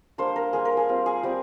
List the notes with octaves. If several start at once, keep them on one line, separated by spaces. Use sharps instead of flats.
G3 A#3 D4 C5
A#4
G3 A#3 D4 G#4
A#4
G#4
G3 C4 F4
G#4
G3 C4 F4 G4